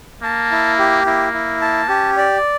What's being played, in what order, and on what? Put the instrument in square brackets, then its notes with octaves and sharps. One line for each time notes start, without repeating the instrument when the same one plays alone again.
[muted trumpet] A#3 [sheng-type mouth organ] A5
[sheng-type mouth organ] E4
G4
[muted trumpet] A#3 [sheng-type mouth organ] E4
[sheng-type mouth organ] E4
A5
[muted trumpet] C#4 [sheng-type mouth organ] G4
[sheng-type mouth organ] D5